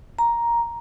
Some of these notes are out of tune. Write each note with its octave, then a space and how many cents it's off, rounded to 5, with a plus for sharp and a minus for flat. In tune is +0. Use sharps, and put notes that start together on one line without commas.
A#5 +5